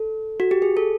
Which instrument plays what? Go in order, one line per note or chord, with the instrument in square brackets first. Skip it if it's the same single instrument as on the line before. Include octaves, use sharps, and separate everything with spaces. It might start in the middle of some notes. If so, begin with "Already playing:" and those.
Already playing: [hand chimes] A4
F#4
G4
G#4
A4